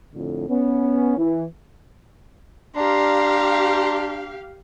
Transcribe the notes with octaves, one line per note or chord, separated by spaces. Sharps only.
F2 A2 D3
B3 C#4
E3
D4 G4 F5 A#5 C6